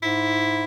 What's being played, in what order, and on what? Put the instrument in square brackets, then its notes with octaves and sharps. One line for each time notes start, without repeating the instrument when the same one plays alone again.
[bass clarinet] G#2 [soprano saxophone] E4